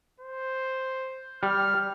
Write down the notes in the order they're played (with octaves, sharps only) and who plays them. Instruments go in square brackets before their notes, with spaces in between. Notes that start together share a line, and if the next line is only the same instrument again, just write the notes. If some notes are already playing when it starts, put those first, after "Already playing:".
[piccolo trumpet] C5
[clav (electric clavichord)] G3 [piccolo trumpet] F6